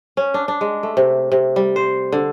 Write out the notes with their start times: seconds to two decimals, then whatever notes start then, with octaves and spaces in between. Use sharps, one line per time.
0.17 C#4
0.34 D4
0.48 D4
0.61 G#3
0.83 A3
0.97 C3
1.32 C3
1.56 G3
1.76 C5
2.12 D3